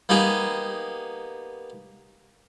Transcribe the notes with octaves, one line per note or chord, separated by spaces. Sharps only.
A#3 B3 D#4 G4 G#4